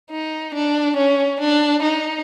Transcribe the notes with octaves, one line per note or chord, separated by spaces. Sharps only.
D#4
D4
C#4
D4
D#4